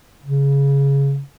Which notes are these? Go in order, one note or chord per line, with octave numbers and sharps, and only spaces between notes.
C#3